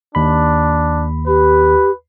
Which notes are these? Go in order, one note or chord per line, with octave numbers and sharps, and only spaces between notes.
D#2 D4 B5
G4 B4